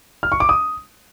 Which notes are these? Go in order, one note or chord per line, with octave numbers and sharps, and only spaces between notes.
F6
C#6
D6
D#6